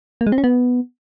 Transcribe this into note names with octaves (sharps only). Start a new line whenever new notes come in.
A#3
G#3
C4
C#4
B3